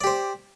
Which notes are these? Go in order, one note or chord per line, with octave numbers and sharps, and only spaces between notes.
G4 C5 D5